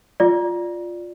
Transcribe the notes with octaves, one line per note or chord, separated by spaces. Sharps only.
F4 D5